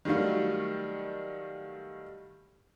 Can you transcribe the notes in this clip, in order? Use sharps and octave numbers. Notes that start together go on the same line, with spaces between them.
D#3 F#3 G3 A3 F4